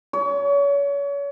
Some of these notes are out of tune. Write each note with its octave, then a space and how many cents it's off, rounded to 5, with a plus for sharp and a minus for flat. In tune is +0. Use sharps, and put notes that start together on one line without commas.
C#5 +35